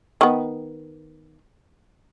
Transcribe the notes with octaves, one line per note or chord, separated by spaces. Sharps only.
D#3 B3